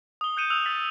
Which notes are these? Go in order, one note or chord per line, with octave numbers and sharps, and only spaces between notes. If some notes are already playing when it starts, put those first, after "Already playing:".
D#6 G7
F#6 G6 C#7 D#7 E7
D#6 E6 F#6 F7
E6 A6 B6